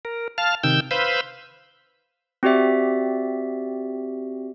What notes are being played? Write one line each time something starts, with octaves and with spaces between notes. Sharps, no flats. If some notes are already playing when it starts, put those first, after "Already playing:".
A#4
F5 A5 F6
C3 D#3 G5 E6 G6
B4 C5 F5 B5 E6 G6
C4 F#4 G4 D5 E5